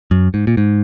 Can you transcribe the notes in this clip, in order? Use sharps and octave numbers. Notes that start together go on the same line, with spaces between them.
F#2
G#2
A#2
G#2